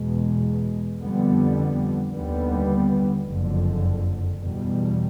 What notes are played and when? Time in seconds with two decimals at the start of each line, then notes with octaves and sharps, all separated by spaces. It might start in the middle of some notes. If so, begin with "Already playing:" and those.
Already playing: E2 B2 G#3
1.00 F2 D3 G3 B3
2.13 D#2 D3 G3 B3
3.26 F#1 F2 D3
4.39 E2 B2 G3